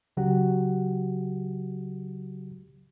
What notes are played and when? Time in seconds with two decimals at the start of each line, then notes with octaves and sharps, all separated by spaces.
0.17 C#2 C#3 F#3 F#4 G4 F#5